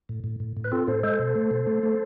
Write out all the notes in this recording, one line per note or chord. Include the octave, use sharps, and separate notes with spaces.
A2
A2
A2
A2
B4
C4 F4 A4
A2 A4 C5
G#3 A4 C5
B2
A3
B2
A3
A3